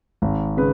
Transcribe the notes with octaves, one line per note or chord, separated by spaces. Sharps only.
G#1
C#3 B4